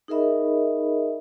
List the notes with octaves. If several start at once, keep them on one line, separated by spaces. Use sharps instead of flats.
D#4 G#4 A#4 D#5 E5 B5